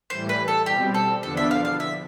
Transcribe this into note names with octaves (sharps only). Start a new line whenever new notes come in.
A2 E3 G3 C5
B4
A4
B2 G3 C4 G4
A4
E2 D3 F3 B3 D4 A4
E5
F5
F5
E5